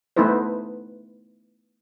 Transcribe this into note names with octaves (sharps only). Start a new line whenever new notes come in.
A3 B3 D#4 E4 B4 C5